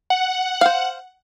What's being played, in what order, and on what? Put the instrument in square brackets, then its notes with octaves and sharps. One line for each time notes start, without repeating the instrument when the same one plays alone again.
[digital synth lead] F#5
[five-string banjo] C5 F5